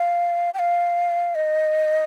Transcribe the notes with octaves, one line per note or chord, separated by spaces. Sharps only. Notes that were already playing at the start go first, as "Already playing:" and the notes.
Already playing: F5
G5
F5
D#5